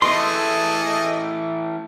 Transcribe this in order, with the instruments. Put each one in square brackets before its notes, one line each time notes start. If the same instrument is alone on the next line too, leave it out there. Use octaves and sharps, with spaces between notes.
[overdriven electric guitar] E3 A3 [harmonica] G#4 A4 D#5 [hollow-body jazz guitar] C6